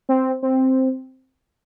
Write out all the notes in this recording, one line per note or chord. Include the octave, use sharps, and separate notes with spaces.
C4
C4